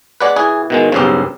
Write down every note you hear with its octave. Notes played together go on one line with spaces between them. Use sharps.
D3 G#3 B4 D5 F#5
E3 G#4
B2 D#3 G#3
B1 G2 C#3 G4 C5